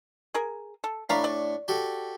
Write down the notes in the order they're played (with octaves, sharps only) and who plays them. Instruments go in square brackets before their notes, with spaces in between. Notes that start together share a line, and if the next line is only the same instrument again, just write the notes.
[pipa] G#4 A#4
A4
[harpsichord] A2 D4 C#6 [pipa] F5 A#5 B5
[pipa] D5
[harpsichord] F#4 G4 A4